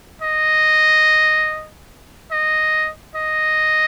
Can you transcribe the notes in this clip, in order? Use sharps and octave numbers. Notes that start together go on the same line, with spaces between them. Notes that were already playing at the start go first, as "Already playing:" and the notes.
D#5
D#5
D#5